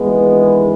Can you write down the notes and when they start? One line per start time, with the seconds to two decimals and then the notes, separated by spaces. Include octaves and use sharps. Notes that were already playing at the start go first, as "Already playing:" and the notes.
Already playing: G#1 G2 E3 G#3 B3